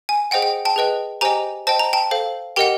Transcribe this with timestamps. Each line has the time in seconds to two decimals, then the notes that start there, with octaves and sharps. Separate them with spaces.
0.09 G#5
0.31 G#4 C5 D#5 F#5 G5
0.42 G5
0.65 G5 A5
0.76 G#4 B4 D#5 G5
1.21 G4 C5 D#5 G5 G#5 A#5
1.67 C5 D#5 G5 A5
1.79 A#5
1.93 G5 A5
2.11 A4 C5 F5
2.56 G4 A#4 D#5 F#5 G5